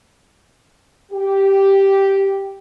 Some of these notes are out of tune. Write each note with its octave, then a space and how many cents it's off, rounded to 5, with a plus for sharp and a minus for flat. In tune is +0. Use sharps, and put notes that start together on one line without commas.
G4 -5